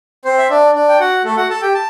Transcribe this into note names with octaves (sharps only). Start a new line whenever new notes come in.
C4 C5
E5
D4 D5
D4 D5
G5
F#4 F#5
A3 A4
F#4 F#5
A4 A5
G4 G5
A5